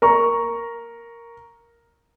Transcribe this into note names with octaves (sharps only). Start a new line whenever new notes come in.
A#4 A#5 C#6